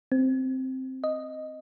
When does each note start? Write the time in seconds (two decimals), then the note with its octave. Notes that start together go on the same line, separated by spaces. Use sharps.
0.12 C4
1.04 D#5